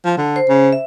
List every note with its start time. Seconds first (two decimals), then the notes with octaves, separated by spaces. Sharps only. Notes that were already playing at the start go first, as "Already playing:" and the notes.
0.05 F3
0.17 D3
0.36 C5
0.49 C#3
0.72 E5